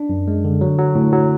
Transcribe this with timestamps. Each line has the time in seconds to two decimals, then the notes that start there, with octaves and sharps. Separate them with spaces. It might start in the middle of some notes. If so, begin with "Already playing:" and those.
Already playing: D4
0.10 F#2
0.28 G#3
0.44 D3
0.61 F#3
0.79 F#3
0.95 A2
1.13 F#3